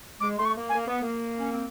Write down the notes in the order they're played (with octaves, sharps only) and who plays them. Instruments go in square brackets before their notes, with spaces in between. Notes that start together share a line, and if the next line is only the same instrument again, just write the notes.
[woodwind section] G#3 [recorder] D6
[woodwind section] A3 [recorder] C6
[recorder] C#6
[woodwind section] A#3
[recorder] G#5
[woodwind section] A#3
B3
A#3
C#4
C4